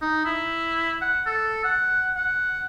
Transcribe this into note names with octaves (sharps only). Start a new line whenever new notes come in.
D#4
E4
F#5
A4
F#5
F#5